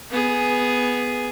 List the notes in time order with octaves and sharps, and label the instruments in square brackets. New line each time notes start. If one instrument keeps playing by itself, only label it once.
[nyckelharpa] B3 G#4